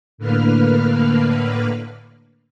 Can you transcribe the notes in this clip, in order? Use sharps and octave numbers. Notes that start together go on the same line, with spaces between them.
A2 D3 A#3 B4 F6